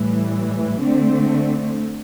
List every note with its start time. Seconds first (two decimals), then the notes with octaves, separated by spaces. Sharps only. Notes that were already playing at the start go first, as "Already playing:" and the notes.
Already playing: A2 E3 G3
0.80 D3 A3 C4